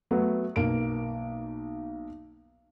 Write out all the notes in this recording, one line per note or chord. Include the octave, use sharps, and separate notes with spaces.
F#3 A3 B3
B1 A#3 D7